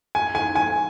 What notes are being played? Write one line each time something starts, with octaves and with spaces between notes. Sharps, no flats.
G#5
G#5
G#5